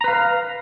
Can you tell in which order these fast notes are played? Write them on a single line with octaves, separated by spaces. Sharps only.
A#5 B4 F5